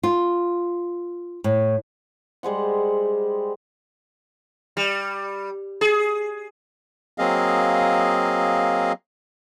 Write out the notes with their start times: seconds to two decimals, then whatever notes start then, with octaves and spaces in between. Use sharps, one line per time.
0.03 F4
1.44 A2
2.43 G3 G#3 C5 F#5
4.77 G3
5.81 G#4
7.18 F#3 A#3 C4 G#4 D#5 F5